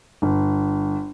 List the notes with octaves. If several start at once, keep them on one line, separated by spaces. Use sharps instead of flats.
G1